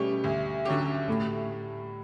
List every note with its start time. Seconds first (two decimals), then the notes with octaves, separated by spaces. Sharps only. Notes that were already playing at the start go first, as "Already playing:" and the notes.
Already playing: B2 G3 A3 C#4 G4
0.24 D2
0.65 D3 F#3 C#4 G4
1.08 A2 A3